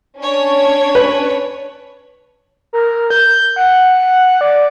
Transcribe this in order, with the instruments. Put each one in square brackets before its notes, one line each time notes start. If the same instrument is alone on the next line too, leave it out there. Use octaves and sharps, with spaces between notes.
[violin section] C#4 D4 C#5
[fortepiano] B4
[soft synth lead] A#4
G6
F#5
D5